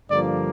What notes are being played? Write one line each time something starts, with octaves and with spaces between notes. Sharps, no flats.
G2 D3 F3 A#3 D5